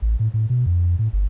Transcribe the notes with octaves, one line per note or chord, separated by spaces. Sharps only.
A1
A2
A2
B2
F2
A2
G1